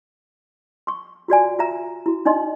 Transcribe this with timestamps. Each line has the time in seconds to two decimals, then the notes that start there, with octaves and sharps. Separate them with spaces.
0.87 C6 C#6
1.28 F4 F#4 D5 G#5
1.59 F4 E5 A#5
2.06 E4 F#4
2.25 D4 D#4 D5 D#5 C6